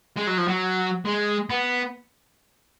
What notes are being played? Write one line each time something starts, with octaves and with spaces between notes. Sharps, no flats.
G#3
F#3
F3
F#3
G#3
B3